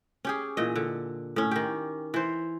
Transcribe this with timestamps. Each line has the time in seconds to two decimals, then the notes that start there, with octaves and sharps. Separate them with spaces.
0.25 C#4 G4 G#4
0.57 A#2 E3 D#5
0.76 D3
1.36 A2 C#4
1.51 D#3 G4
2.14 E3 C5